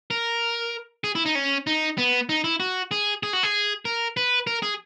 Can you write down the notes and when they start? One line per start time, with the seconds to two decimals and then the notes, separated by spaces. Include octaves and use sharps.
0.11 A#4
1.04 G#4
1.15 E4
1.26 D#4
1.35 C#4
1.67 D#4
1.98 B3
2.29 D#4
2.44 E4
2.60 F#4
2.91 G#4
3.23 G#4
3.33 F#4
3.43 G#4
3.85 A#4
4.17 B4
4.47 A#4
4.62 G#4